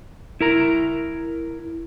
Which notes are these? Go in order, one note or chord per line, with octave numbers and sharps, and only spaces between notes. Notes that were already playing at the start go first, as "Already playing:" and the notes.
E4 A#4 A#5